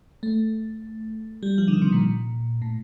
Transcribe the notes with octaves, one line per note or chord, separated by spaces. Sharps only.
A3
G3
F3
D3
D#3
C3
A#2
A2